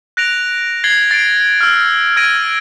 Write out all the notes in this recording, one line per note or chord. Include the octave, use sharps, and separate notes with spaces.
F#6 A#6 D7 F7
G#6 A6 C7 F#7 G7
A6 C7 D7
E6 F6
F6 G#6 A#6 D7 D#7